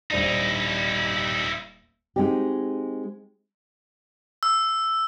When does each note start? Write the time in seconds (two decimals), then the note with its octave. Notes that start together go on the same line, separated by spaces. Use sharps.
0.11 D#1 D#4 E4 C5 D5
2.16 G#3 C4 D#4 F#4 G4
4.43 E6